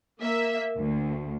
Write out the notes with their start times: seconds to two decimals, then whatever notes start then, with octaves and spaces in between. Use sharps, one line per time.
0.21 A#3 E5
0.78 D2